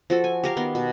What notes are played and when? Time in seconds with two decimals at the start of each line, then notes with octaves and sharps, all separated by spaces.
0.10 F3 F#4 A4
0.24 G#5
0.44 G4 A#4 F5
0.57 D#3 B3 C6
0.75 B2